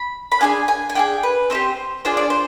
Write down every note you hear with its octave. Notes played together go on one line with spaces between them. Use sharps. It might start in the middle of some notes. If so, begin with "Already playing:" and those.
Already playing: B5
B5
D4 F4 G#4 G#5
G#5
G#5
D4 F4 G#4 G5
B4
C4 D#4 G4 C5
D4 F4 G#4 C5
D5
C5